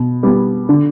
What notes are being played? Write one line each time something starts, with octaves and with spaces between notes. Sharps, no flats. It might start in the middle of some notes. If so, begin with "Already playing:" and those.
Already playing: B2
G3 B3
D3